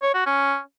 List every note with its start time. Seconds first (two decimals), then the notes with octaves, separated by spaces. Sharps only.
0.02 C#5
0.14 F#4
0.26 C#4